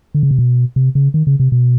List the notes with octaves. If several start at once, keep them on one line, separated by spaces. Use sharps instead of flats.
D3
C#3
C3
B2
C3
C#3
D#3
C#3
C3
B2